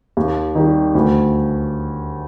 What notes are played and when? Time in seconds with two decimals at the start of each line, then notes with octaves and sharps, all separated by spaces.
0.17 D#2
0.55 D#3 G3
0.95 D2